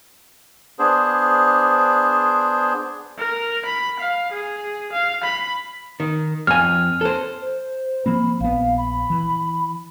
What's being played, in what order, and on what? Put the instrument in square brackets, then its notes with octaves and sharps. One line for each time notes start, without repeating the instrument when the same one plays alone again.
[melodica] B3 D4 G#4 C5
[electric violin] A#4
B5
F5
G#4
F5
B5
[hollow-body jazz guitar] D#3
[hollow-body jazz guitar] F2 G#5 [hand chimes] F6
[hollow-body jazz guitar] A4 C5
[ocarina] C5
[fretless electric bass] F3 A#3 C4 [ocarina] B5
[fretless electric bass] A#1 B3 [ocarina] F5
[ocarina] B5
[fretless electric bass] E3